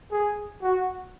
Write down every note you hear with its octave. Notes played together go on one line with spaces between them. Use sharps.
G#4
F#4